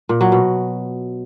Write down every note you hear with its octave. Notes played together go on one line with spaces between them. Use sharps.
A#2
F#3
B2